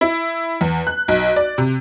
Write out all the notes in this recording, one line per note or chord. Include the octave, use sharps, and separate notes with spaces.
E4
E2
F#6
B1
D5
C3